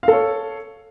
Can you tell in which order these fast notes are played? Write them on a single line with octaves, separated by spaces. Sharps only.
F5 A4 C#5